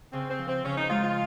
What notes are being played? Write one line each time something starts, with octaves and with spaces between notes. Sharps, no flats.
C#3 C4
C4
F3
C4
C#3 C#4
D#4
G#3 F4
F4